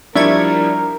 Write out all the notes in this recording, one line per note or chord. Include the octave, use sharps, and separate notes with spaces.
F3 G3 D4 E4 A#4 E5 C#6 G#6